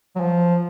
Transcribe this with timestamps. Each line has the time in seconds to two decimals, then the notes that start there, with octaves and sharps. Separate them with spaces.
0.16 F#3
0.20 F3